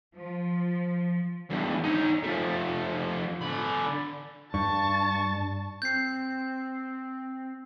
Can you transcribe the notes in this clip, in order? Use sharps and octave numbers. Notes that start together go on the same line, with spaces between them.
F3
E2 G2
D#4 C#5
F3 A3
D3 B5
G2 A5 C#6
C4 G6 C7